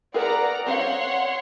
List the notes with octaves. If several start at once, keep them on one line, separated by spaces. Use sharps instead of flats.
G#4 A#4 B4 D5 F#5 A#5
C4 C5 C#5 F5 F#5 C6